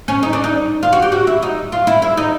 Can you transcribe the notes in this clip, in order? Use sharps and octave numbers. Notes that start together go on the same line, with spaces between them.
C#4
D#4
D4
D#4
F4
F#4
G4
F#4
E4
D#4
F4
E4
E4
D#4